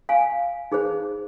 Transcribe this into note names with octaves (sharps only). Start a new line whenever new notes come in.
F5 G#5
D#4 G#4 C5